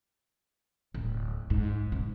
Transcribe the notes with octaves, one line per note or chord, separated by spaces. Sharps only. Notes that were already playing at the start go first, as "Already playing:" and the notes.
D1
G#2
C3